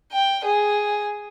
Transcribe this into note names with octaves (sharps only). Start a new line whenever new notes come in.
G5
G#4